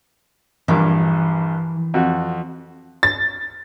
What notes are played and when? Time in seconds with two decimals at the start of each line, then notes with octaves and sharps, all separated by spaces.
0.68 A#1 G2 E3
1.94 F2 F#4
3.03 A6